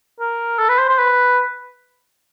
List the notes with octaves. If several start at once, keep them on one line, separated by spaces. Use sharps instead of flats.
A#4
A4
B4
C5
C5
B4